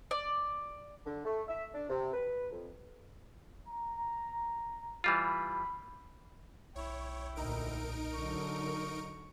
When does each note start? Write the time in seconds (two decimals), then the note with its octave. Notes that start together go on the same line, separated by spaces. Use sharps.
0.11 D5
1.05 D3
1.25 A3
1.48 E5
1.74 D4
1.90 C3
2.13 B4
2.51 F2
3.68 A#5
5.04 E3 G3 F4 B5
6.76 B1 E4 C#5 G5
7.36 D2 A#2 D#4 A#4 D7
8.13 D3 F#3 C#6